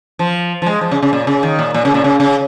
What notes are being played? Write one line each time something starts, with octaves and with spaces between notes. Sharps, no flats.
F3
F3
G#3
F3
C#3
C#3
A#2
C#3
D#3
A#2
A#2
C#3
A#2
C#3
C#3